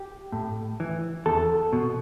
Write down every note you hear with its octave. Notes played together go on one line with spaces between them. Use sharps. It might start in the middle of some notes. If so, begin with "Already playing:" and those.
Already playing: G4
A2
E3
E2 A4
B2